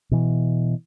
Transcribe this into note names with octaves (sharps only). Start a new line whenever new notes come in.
B2 E3